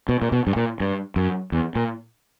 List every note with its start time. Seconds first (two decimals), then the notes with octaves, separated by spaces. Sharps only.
0.09 B2
0.22 A#2
0.32 B2
0.47 G2
0.56 A#2
0.80 G2
1.16 F#2
1.52 E2
1.76 A#2